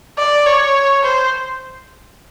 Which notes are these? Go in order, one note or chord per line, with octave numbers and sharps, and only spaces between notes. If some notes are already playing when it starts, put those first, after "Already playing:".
D5
C#5
C5